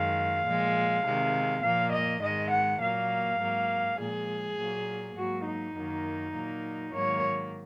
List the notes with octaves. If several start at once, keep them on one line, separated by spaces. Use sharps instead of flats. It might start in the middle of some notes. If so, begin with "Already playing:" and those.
Already playing: F#2 D#3 G#3 F5
A#2 F3 G#3
C3 D#3 G#3
A#2 F3 A#3 F5
D#5
G#2 D#3 G#3 D#5
F#5
A#2 F#3 A#3 F5
G#2 F#3 A#3
A#2 F3 G#3 G#4
A#2 F#3 A#3
G#2 F#3 A#3 F#4
D#4
F#2 D#3 F#3 A#3
A#2 F#3 A#3
G#2 D#3 F#3 A#3 C#5